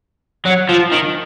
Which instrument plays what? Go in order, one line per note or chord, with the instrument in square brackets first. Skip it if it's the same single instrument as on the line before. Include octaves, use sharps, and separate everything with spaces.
[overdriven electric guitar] F#3
F3
D#3